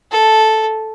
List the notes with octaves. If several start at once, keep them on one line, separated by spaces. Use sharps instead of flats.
A4